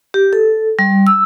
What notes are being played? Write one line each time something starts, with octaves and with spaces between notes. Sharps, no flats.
G4
A4
G3
E6